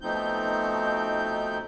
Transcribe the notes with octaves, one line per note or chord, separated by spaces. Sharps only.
B2 F3 A3 C4 D#4 G6